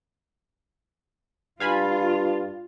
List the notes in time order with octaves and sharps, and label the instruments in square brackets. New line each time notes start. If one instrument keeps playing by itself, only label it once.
[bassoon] G2 [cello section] F4 [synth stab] F5 G#5 B5